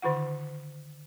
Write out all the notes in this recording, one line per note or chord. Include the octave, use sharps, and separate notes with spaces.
D3 D#3 F4 F#5